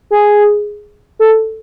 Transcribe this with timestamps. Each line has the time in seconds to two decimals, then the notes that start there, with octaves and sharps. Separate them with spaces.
0.11 G#4
1.19 A4